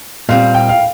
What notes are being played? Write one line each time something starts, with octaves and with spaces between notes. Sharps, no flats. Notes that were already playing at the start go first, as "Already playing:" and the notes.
A#2 G3 C4 F5
G5
F5